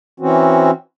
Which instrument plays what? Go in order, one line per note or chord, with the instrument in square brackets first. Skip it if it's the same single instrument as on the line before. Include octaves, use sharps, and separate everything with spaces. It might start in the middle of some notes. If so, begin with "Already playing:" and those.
[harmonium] E3 C4 C#4 F#4